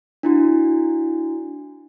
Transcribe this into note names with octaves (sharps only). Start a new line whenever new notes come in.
D4 E4 F#4